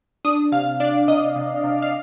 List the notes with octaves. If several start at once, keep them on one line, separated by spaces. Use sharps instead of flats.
D4 D#6
C3 F5
D4 D5
C3 D#5
C3
C3
F5